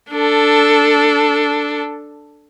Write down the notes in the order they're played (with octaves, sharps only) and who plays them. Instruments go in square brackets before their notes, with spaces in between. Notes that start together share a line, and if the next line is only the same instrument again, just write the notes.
[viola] D4 A4